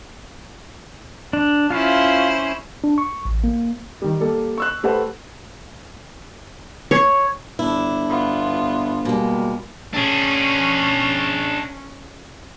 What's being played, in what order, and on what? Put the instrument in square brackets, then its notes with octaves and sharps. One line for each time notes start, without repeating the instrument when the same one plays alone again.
[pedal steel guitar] D4
[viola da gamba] C#4 E4 C5 [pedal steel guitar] F4 F5
[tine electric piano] D4
C#6
A1
A#3
[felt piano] D#3 G3
G3 A#3 A4
C#6 E6 F#6
A3 G4 A4 B4 C5 F#5
[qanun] C#5
[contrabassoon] G1 [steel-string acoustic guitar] D4 E4
[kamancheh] B3 F4
[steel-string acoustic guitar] B2 G#3 [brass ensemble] G3 A#3
[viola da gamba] C#4 [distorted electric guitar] D4 G#4